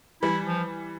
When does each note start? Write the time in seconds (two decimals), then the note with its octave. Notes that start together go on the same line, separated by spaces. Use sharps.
0.22 E3 G3 E4
0.46 F3